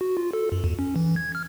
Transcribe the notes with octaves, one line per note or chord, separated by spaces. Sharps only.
F#4
F4
A4
F#2
E2
C#4
E3
G#6
F6